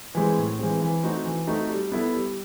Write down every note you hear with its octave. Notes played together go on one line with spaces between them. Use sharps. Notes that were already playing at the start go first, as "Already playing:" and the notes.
E3 G#3 C4
A2
E3 G#3 C4
E3
A3 C4 D#4 F#4
E3
A3 C4 D#4 F#4
G3
B3 E4 A4
G3